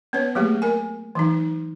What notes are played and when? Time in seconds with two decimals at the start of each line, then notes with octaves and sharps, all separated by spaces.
0.13 B3 C#4 B4 C#5
0.35 F#3 A3 A#3 G4 G#4
0.62 A#4 G#5
1.15 E3 F#3 D#4